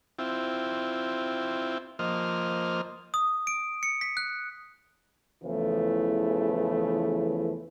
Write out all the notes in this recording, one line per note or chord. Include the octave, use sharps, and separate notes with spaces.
C4 E4 F4 G5
F3 A#3 C5 D#5 F6
D#6
D7
C#7
B6
F#6
E2 C#3 E3 F3 A3